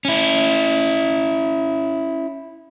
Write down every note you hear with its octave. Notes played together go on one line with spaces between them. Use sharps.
C#4 E4